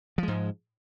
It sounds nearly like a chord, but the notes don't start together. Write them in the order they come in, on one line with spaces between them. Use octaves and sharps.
F3 G#3 G#2